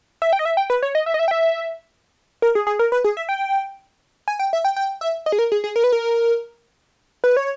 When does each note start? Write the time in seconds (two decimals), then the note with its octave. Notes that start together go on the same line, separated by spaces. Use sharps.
0.22 E5
0.33 G5
0.39 D#5
0.45 E5
0.57 G5
0.70 B4
0.82 C#5
0.95 D#5
1.06 E5
1.14 D#5
1.19 E5
1.28 G5
1.31 E5
2.42 A#4
2.55 G#4
2.67 G#4
2.79 A#4
2.92 B4
3.04 G#4
3.17 E5
3.29 G5
4.28 G#5
4.39 G5
4.53 E5
4.65 G5
4.76 G5
5.01 E5
5.26 D#5
5.32 G#4
5.39 A#4
5.52 G#4
5.64 G#4
5.76 A#4
5.84 B4
5.92 A#4
7.24 B4
7.37 C#5